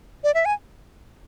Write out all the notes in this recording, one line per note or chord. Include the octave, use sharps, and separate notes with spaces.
D5
E5
G#5